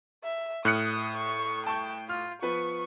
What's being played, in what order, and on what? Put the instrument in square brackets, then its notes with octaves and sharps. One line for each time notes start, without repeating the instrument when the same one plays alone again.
[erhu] E5
[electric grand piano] A2 F#6 C#7 [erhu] D#6 [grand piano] F6
[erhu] C#6
[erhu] G5 [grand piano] A5 C#6 G6
[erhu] F4 [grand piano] F6
[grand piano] F3 B3 B4 [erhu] C#6